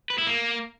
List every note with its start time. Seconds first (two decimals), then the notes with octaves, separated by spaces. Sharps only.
0.10 B4
0.18 E4
0.27 A#3